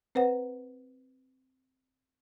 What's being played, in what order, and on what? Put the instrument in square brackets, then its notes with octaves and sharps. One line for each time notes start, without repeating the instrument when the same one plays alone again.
[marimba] C4 B4 C5 F#5